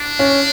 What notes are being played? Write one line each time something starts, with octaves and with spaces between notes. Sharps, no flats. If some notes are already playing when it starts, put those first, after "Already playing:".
Already playing: D4
C#4